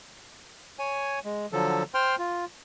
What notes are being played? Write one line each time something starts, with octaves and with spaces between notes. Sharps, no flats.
C#5 G#5
G#3
D3 F3 F#3 A4
C5 G5 C6 F6
F4